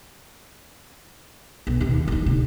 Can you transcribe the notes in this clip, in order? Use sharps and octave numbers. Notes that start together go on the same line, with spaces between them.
B1
D#2 C#3
D#3 D#4
D2 C3